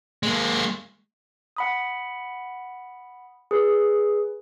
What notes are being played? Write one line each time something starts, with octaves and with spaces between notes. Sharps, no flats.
G#3 A#3
F#5 B5 D#6
G#4 B4